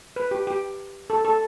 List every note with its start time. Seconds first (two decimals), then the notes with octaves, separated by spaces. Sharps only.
0.16 B4
0.31 G4
0.47 G4
1.10 A4
1.25 A4